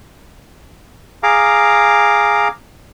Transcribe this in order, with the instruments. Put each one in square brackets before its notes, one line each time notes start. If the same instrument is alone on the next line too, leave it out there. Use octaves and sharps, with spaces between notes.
[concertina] G#4 F5 A#5 D6